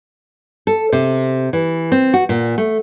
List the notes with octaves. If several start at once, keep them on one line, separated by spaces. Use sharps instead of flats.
A4
C3
E3
C4
F#4
A#2
A3